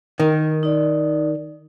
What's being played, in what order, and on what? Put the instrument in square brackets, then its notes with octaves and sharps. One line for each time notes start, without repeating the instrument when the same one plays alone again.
[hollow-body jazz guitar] D#3 [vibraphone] A#4
[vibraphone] D#4 D5